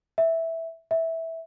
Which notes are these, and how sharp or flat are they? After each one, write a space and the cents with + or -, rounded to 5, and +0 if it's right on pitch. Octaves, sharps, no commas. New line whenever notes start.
E5 -5
E5 -10